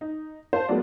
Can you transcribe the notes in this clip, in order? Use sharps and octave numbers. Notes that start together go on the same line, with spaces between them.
D#4
C5 F5 A5
F#3 G#3 A#3 B3 D5